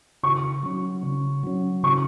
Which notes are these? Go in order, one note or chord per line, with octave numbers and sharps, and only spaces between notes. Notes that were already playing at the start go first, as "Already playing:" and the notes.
C#3 C#6
F#3 C#4
C#3
F#3 C#4
C#3 C#6